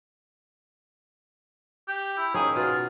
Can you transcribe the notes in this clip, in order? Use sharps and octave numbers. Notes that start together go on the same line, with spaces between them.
G4
E4
D#3 A#3 C#4 G#4
B2 F4